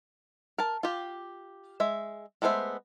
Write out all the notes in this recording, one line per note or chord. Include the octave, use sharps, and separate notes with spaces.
A#4 A5
F4 G4
G#3 E5
G#3 A3 B3 C5 E5